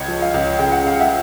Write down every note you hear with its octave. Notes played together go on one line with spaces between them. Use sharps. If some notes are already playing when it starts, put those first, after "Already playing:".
Already playing: C#2 C#5 D#5
F3
D#5 F5
C#2
C#3 G5
F#5
C#3 F5
E5 F#5